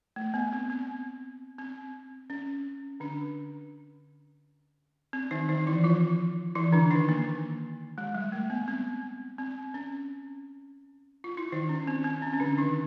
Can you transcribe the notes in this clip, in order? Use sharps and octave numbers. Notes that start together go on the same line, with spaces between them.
A3
B3
C4
C4
C4
C#4
D3 D4
C4
D#3 D#4
D#3 D#4
E3 E4
F3 F4
E3 E4
D3 D4
D#3 D#4
A#3
G#3
G3
A3
B3
C4
C4
C#4
F4
E4
D#3 D#4
C#4
C4
C4
C#4
C#4
D3 D4
D#3 D#4